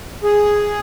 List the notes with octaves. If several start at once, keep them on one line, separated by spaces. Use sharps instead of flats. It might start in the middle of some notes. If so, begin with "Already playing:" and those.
G#4